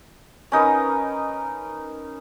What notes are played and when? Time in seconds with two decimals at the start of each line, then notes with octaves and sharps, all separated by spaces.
0.52 C#4 D#4 A#4 B4